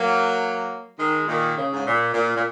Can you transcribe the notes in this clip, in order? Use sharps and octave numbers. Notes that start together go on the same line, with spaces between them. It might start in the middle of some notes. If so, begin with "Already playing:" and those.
Already playing: F#3 A#3
D#3 G#3
A#2 D#3
C#3
G#2
A#2
A#2
A#2